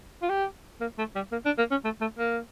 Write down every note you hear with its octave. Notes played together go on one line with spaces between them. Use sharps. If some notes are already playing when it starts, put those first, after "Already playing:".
F4
G4
A#3
A3
G3
A#3
D4
A#3
C#4
A3
A3
A#3